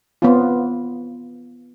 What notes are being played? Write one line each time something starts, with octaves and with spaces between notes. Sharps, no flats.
B3 C4 F4